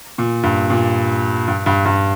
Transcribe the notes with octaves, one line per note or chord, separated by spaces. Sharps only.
A#2
G2
A#2
G2
G2
G2